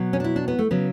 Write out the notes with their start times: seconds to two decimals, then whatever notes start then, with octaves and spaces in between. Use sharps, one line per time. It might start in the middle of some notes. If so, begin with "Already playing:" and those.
Already playing: B2 F#3
0.13 C#4
0.20 D4
0.24 E4
0.36 D4
0.48 B3
0.59 A3
0.71 C#3 F#3 B3